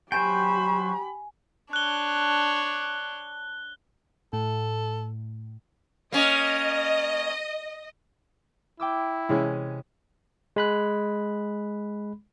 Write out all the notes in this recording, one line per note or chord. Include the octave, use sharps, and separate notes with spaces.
F#3 G4 C5 G5 G#5 B5 C#6
D4 C#5 F#6 G7
A2 A4
A#3 C#4 D#5
E4 G5 D6 E6
C3 E3 G#3 C#4
G#3 B5 F#6